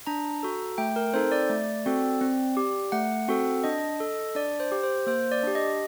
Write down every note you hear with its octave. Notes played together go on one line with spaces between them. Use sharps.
D4 A#5
F#4 A4
A3 G5
A#4
C4 D#4 A4 C5
D5
A3
C4 F#4 A4
C4
G4
A3 F#5
C4 F#4 A4
D4 D#5
A4
D4 D5
C5
G4
C5
A#3 C5
D5
D4 G4
D#5